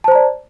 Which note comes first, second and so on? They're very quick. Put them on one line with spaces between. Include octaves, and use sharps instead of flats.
A5 C5 A#5 D5